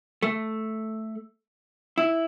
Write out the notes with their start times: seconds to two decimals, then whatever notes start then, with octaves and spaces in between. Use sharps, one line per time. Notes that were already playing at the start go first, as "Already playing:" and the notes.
0.23 A3
1.98 E4